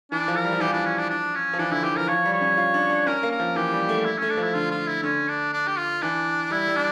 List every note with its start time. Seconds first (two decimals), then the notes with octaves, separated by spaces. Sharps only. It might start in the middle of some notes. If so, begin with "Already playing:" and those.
0.11 E3 D4
0.28 F3
0.36 A#4
0.44 G3
0.53 F3
0.61 E3 G4
0.68 F3 D4
0.86 C#4
0.98 D4
1.10 D4
1.35 C#4
1.53 F3
1.59 E3 D4
1.71 D3 E4
1.83 E3 G4
1.96 F3 A#4
2.08 F3 C#5
2.25 G3
2.33 C#5
2.41 C#4
2.57 F4
2.74 D4
2.90 D4
3.07 C#4 A#4
3.23 A#3
3.31 A#4
3.40 F3
3.56 E3 G4
3.72 G3
3.89 A3
4.05 E4
4.18 A3 C#4
4.30 D4
4.37 F3 E4
4.54 D3 F4
4.71 F4
4.87 E4
5.03 D3 C#4
5.28 D4
5.53 D4
5.67 G4
5.77 F4
6.02 E3 D4
6.51 G3 E4
6.68 G3
6.76 D4